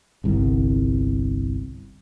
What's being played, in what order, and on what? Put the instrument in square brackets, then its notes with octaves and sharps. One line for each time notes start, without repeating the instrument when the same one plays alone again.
[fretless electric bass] G1 C2